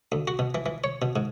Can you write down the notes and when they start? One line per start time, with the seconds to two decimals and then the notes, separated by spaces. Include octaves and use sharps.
0.12 D2
0.28 F#4
0.39 B2
0.55 E3
0.66 E3
0.84 C#5
1.02 B2
1.16 G#2